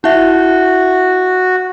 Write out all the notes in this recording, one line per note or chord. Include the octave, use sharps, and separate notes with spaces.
E4 F#4 E5